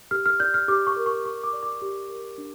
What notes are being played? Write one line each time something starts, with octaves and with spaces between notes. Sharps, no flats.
G4 F6
F6
D5 G6
F6
G4 D6
C#6
A#4
C#6
G4 C#6
D6
D5
D6
G4
A#4
D4